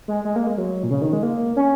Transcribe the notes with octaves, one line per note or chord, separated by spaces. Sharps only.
G#3
G#3
A#3
G#3
F#3
A#2
C#3
D#3
G#3
A#3
C#4